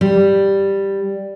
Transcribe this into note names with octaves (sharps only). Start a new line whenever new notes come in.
G3